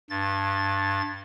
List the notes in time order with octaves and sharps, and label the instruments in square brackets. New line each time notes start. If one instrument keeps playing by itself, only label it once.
[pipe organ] G2 A6